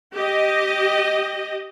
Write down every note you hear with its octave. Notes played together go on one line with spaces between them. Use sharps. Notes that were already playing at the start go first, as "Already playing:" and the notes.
G4 D#5